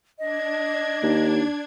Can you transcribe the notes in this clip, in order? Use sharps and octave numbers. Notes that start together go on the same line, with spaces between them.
D4 D#5 G#6
D#2